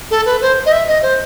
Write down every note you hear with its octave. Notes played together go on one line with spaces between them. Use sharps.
A4
B4
C5
D#5
E5
D#5
C5